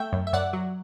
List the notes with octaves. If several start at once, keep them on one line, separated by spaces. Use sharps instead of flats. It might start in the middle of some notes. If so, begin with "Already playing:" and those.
Already playing: A3 E5 G5
F#2
E5
F#2 D5 F#5
F#3